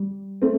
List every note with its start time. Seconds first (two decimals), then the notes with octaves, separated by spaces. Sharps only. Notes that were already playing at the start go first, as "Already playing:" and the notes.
Already playing: G3
0.42 A3 C4